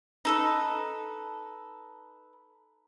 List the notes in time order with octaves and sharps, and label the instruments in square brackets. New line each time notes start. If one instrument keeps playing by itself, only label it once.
[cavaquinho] D#4 A4 B4